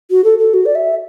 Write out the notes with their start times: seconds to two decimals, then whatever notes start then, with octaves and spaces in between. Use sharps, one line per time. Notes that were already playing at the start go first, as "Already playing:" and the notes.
0.10 F#4
0.24 A4
0.38 A4
0.53 F#4
0.65 D5
0.75 E5